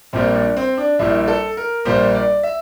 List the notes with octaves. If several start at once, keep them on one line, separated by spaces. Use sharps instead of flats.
A#1 A#2 G3 A#3 C4
D4
C4
D4
A#1 A#2 G3 A#3 E4
A4
A#4
A#1 A#2 G3 A#3 C5
D5
E5